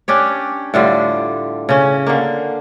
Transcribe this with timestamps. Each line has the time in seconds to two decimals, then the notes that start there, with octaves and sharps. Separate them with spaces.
0.08 C#4 D4 G4 C#5
0.74 A2 D3 G3 F4
1.69 C#3 C#4
2.07 D3 A#3